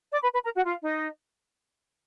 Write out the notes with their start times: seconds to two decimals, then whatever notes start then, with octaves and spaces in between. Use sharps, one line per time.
0.12 D5 D6
0.23 B4 B5
0.33 B4 B5
0.44 A#4 A#5
0.55 F#4 F#5
0.66 F4 F5
0.83 D#4 D#5